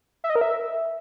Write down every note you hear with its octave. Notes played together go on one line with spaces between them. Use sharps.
E5
D#5
A#4
E5